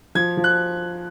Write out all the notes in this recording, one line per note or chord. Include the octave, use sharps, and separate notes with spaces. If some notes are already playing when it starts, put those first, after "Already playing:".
F3 G#6
F3
F#6